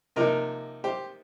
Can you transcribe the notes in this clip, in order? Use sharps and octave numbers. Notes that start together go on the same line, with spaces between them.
C3 F3 A#3 D#4 A#4 D#5
G4 C5